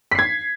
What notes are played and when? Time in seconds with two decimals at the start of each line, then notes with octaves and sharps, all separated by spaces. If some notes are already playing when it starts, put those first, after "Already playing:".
0.12 B6
0.15 C7
0.19 G#6